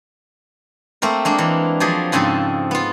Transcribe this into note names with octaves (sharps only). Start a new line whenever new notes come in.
A3 A#3 C4 A#4
G#3 A#3 D4
E3
F3 F#3 G#4 D5
G#2 C#3 C4 G#4 A4 B5
B3 F4